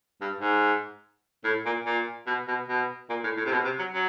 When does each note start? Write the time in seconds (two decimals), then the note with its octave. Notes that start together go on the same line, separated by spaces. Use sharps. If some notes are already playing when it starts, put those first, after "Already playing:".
0.21 G2
0.41 G#2
1.45 A2
1.66 A#2
1.86 A#2
2.27 B2
2.48 B2
2.68 B2
3.10 A#2
3.24 A2
3.37 A2
3.46 C3
3.52 B2
3.65 C3
3.79 F#3
3.93 F#3